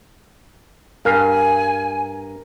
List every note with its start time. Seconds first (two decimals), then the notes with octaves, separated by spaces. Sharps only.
1.05 G2 A#4 F5 G#5